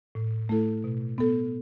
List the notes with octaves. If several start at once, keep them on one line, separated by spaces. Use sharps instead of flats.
A2
A3 E4 A4
B2
B3 A4